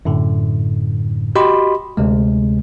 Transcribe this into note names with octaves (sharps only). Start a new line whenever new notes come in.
F#2 A2 D3
F#4 G4 D#5 B5 C6
D2 C3 G#3